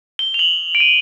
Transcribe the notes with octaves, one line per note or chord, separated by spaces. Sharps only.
G7
F7
F#7
D7
D#7